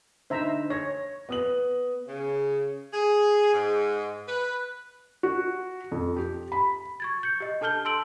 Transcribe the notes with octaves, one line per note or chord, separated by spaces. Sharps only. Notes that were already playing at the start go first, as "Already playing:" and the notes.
D3 D#4 C5 E5 A#5
C#5 A#6
B3 D#6 F#7
C#3
G#4
G#2
B4
F#4
F2
G4
B5
C#6 G#6 A6
G6 C#7
G4 D#5
D4 A4 A5 F6 G6 G7
A5 C6 E6 D7 F#7